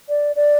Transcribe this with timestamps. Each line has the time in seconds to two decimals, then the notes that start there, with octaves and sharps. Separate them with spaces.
0.09 D5
0.36 D5